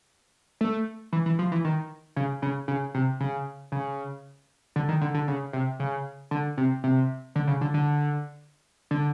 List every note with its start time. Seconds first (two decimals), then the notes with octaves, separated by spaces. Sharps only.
0.61 A3
1.13 E3
1.26 E3
1.39 F3
1.52 E3
1.65 D#3
2.16 C#3
2.42 C#3
2.68 C#3
2.95 C3
3.20 C#3
3.72 C#3
4.76 D3
4.89 D#3
5.01 D3
5.15 D3
5.28 C#3
5.53 C3
5.80 C#3
6.31 D3
6.57 C3
6.84 C3
7.36 D3
7.47 C#3
7.61 D3
7.74 D3
8.91 D3